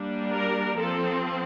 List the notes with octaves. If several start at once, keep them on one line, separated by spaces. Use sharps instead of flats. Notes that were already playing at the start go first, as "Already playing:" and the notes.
Already playing: G3 A#3 D4
A#4
F3 C4 A4